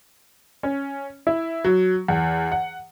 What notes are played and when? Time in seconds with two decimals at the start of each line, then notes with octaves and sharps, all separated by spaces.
0.63 C#4
1.27 E4
1.64 F#3
2.08 E2
2.52 F#5